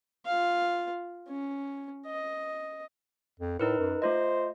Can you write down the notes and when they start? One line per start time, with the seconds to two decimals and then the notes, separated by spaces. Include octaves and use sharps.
0.26 F4 F5
1.28 C#4
2.07 D#5
3.40 F2
3.60 A2 D#4 A#4 B4
3.79 F#2
4.02 A3 F4 C5 D#5